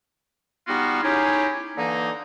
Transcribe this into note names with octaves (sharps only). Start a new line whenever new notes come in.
G3 B3 D#4 F4 F#4
C#4 D#4 E4 G4 G#4
D3 E3 A#3 D#4